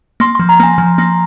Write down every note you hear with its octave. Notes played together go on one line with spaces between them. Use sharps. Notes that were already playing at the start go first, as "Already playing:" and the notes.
A#3 C6
F3 C6
A#5
A#3 G#5
F3
A#3